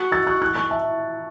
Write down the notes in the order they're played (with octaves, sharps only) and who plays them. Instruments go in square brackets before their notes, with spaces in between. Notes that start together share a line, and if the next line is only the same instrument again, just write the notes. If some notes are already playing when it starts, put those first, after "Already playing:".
Already playing: [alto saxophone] F#4
[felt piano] E6 A6
C#6 F#6
C#6 F#6
C#6 F#6
E5 A5